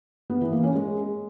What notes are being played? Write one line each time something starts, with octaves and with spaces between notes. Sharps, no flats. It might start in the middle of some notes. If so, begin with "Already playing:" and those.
B3
E3
A#3
C#4
G#3